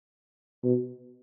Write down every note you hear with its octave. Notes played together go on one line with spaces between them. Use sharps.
B2